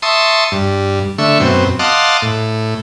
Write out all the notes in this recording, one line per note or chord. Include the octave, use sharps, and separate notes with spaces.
E5 A5 C6 C#6 D#6
G2
D3 A3 E5 C#6
F#2 B2 C4
D#5 F5 F#5 A5 C6 D6
A2